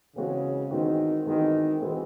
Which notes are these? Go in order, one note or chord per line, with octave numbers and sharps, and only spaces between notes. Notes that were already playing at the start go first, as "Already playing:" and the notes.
C#3 E3 G#3 C4 F#4
D#3 E3 G#3 C4 F#4
D#3 E3 G#3 C4 F#4
E3 G#3 C4 F#4